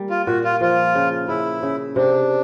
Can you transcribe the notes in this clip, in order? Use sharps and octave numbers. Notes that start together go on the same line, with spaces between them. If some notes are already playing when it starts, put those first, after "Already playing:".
Already playing: G3 A#3
F4
A#2 F#4
F4
F3 F4
C#3
C#3 E4
C#3
C3 D4